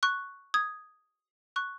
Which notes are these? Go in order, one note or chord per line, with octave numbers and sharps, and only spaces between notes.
C#6 F#6
D#6 G#6
C#6 F#6